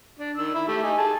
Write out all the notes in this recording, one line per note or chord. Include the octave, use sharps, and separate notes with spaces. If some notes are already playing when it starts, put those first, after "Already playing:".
D4
D#3 E6
E4
A3 G4
D#4 G#5
G#4 A5